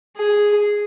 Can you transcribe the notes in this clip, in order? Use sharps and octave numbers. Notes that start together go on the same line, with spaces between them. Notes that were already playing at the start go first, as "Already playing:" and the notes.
G#4